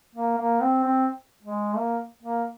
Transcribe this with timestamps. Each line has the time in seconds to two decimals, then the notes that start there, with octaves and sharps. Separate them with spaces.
0.15 A#3
0.38 A#3
0.61 C4
0.84 C4
1.42 G#3
1.76 A#3
2.23 A#3